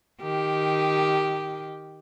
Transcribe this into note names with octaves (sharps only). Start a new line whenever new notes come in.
D#3 G4